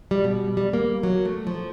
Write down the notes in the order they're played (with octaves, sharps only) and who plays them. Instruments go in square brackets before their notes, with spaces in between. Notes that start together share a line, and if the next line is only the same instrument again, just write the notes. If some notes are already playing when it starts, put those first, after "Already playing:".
[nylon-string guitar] G3
B2
G3
A#3
F#3
A3
F3